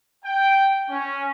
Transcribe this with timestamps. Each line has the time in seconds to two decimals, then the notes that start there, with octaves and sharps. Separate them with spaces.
0.25 G5
0.89 C#4